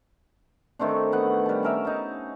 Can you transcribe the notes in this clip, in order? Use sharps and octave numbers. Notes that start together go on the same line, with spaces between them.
D#3 A3 C4 D4
B3 F#5
G3 A5
C#4 A#4 E5
D#4 A5